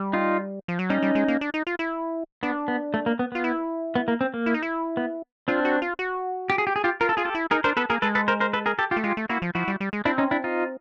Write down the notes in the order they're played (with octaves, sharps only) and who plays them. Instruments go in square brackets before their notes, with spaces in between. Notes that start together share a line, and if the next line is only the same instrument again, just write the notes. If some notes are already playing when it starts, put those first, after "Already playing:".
Already playing: [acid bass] G3
[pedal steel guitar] D#4 F4
[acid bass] F3
F#3
[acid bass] G3 [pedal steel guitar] C#4 D#4
[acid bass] G3
G#3
A#3
D4
D#4
F4
E4
[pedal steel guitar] B3 [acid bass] D4
[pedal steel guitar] B3
A3
A#3
B3
[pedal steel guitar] B3 [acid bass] F4
[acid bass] E4
[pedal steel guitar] B3
A#3
C4
A#3
[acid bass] E4
D#4
E4
[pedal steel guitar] B3
[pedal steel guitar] C4 D4 [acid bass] F4
[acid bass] F#4
F4
F#4
[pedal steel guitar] G4
G#4
G4
G#4
F4 G4
[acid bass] F4 [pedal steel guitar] A#4
[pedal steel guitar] A4
[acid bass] F4 [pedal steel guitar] G#4
[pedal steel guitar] G4 A4
[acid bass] E4
[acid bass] D#4 [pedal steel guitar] G#4 A#4
[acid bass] D4 [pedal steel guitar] A#4 C5
[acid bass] B3 [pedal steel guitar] A4 B4
[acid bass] A#3 [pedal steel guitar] G#4 A#4
[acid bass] G#3 [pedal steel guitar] A4 B4
[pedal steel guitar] A4 B4
A#4 C5
A#4 C5
A4 B4
G#4 A#4
G4 A4
F4 G4
[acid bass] A3
[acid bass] G#3 [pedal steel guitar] F4 G4
[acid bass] A3
[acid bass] A#3 [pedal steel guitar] E4 F#4
[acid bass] F3
[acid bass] F3 [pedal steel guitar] E4 F#4
[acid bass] G3
G3
G#3
[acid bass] C4 [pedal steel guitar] D4 E4
[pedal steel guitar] C#4 D#4
D4 E4
D#4 F4